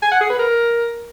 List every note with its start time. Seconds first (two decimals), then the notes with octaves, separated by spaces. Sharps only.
0.03 G#5
0.12 F#5
0.21 G#4
0.30 B4
0.39 A#4